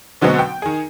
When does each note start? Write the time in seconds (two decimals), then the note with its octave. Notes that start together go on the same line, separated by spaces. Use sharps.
0.21 B2 D3 F#3 G#3 B3 C4
0.39 G5
0.62 D#3 G#4